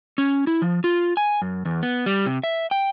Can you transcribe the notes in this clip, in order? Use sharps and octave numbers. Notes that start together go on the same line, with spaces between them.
C#4
E4
F3
F4
G#5
F#2
E2
B3
G3
C3
E5
G5